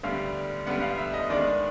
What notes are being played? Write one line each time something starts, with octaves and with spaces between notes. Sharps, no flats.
D2 D3 G3 B3 D4 F5
D2 D3 G3 B3 D4 F#5
F5
E5
D#5
D#2 D#3 G#3 B3 D4 D5